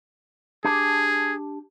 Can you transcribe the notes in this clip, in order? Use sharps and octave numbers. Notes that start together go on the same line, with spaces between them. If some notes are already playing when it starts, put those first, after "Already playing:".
D4 G4 G#4 A5